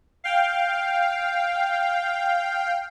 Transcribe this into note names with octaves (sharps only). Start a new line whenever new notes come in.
F5 G5